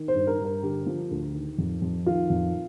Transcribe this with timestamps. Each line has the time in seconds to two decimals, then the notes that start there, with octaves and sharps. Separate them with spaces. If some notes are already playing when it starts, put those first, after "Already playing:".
Already playing: D#3
0.08 C5
0.14 G2
0.27 A#4
0.39 G2
0.45 A#4
0.63 D3 G4
0.86 F3
1.11 D2
1.34 D#3
1.58 F2
1.82 F2
2.06 D#3 F4
2.30 F2